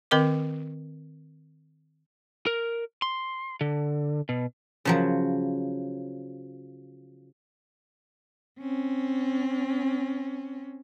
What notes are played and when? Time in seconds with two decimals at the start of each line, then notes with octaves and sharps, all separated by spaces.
0.11 D#3 C4 A#4 D#5 D6
2.47 A#4
3.02 C6
3.61 D3
4.29 B2
4.85 C#3 F3 F#3
8.59 C4 C#4